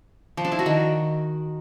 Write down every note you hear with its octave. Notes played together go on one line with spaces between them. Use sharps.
F3
D4
E4
F#4
D#3